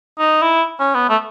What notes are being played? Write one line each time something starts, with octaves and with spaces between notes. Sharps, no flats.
D#4
E4
C#4
B3
A3